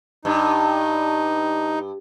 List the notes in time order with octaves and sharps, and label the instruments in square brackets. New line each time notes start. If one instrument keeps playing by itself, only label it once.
[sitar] G2 [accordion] D#4